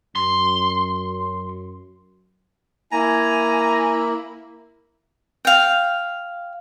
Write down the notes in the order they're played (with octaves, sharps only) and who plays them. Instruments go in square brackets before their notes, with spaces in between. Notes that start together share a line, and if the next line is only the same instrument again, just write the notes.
[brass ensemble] F#2 [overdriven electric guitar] C6
[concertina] A#3 [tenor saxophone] E4 [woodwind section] G#5 [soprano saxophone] A#5
[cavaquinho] F5 G5